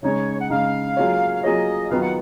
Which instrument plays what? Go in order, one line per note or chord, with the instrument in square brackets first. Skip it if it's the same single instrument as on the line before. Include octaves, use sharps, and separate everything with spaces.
[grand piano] C#3 G#3 D#4 [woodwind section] C#5
[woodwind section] F#5
[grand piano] C#3 G#3 D#4 [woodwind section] F5
[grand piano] F#3 A#3 F4 G#4 C#5
[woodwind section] F5
[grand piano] F#3 A#3 F4 G#4 C#5 [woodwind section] D#5
[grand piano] D#3 F#3 B3 F4 [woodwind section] F5
[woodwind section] F#5